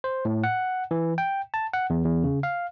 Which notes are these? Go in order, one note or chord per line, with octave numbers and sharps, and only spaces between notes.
C5
A2
F#5
E3
G5
A5
F#5
E2
E2
C#3
F5